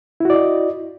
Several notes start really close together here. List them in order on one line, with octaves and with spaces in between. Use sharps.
E4 F#4 D5 D#5